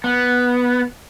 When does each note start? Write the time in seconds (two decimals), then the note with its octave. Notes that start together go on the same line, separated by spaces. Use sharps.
0.04 B3